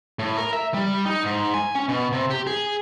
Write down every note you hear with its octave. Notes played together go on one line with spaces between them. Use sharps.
A2
A#4
E5
G3
D#4
G#2
G#5
C#4
B2
C3
G4
G#4